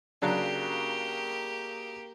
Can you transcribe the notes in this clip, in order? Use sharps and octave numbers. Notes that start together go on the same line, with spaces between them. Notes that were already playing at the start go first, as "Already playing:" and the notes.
C#3 F#3 A#3 D4 G4